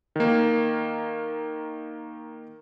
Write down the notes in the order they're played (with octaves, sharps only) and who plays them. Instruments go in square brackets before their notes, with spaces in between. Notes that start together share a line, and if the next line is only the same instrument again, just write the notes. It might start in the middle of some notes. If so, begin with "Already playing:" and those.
[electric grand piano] D#3 A#3